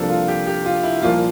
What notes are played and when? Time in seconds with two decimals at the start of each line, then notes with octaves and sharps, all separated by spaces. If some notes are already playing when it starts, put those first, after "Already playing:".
Already playing: C2 C3 F3 A#3 D4 A4
0.09 F4
0.28 G4
0.47 G4
0.66 F4
0.83 E4
1.02 C2 A#2 F3 A#3 F4